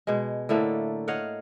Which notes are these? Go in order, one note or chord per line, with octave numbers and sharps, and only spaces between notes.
B2 G#3
A2 D3 A3 A#3
C#5 D#5 F5 F#5